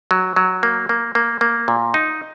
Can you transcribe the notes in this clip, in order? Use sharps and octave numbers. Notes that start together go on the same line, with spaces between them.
F#3
F#3
A#3
A#3
A#3
A#3
A#2
D#4